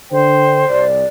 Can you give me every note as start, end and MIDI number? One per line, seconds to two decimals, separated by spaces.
0.12 0.64 50
0.12 0.86 72
0.12 0.64 79
0.69 1.03 36
0.69 1.06 74